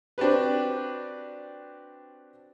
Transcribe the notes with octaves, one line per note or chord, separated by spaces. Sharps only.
C4 D4 F#4 G4 B4